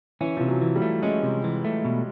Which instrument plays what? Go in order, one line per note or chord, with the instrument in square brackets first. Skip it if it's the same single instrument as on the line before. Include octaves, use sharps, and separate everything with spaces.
[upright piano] E3 [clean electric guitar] C#4
[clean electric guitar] C3 [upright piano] F3
[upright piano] F#3
[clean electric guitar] E3
[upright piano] G3
[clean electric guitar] A3
[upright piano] G#3 [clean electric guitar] C#4
[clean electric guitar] C3
E3
A3
B2